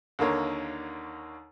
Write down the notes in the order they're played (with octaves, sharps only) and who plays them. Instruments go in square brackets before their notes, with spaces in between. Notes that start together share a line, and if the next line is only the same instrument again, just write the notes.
[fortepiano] D#2 D3 A#3 C#5